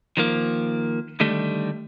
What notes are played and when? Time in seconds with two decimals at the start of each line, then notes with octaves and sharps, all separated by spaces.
0.17 D#3 F3 A#3
1.20 D3 D#3 G3 A3